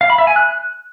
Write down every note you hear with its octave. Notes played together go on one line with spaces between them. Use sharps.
F5
B5
E5
G#5
F#6